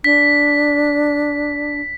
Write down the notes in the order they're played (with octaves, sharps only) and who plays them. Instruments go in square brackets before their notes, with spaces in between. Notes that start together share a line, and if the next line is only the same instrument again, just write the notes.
[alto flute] D4 [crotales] B6